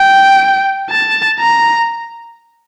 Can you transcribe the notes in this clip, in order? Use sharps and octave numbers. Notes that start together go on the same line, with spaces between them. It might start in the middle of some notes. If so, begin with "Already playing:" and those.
Already playing: G5
A5
A#5